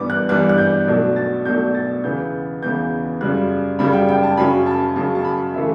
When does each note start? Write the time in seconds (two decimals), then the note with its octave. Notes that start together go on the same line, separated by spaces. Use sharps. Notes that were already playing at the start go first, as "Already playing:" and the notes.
Already playing: G2 E3 G3 B3 D6
0.10 F#6
0.29 G2 E3 G3 B3 F#6
0.49 F#6
0.58 G6
0.87 B1 B2 F#3 A3 D4
1.16 A6
1.45 B1 B2 F#3 A3 D4 G6
1.75 A6
2.04 E2 C#3 E3 B3 G6
2.62 E2 C#3 E3 B3 G6
3.21 F#2 C#3 G3 F#6
3.79 F#2 C#3 G3 B5
3.93 G5
4.09 G5
4.23 A5
4.37 F#2 C#3 F#3 C#4 B5
4.66 A5
4.96 F#2 C#3 F#3 C#4 A5
5.15 A5
5.25 B5
5.54 C#3 E3 A3 E5